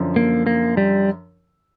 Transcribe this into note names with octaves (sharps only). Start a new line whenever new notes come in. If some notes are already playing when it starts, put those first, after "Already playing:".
Already playing: F#2 D3 F3
A#3
A#3
G3